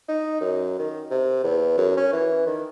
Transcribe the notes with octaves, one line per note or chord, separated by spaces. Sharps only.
D#4
F#2
D#3
C3
E2
F#2
C#4
E3
D#3